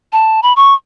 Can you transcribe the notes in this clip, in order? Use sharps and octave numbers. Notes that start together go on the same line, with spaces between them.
A5
B5
C#6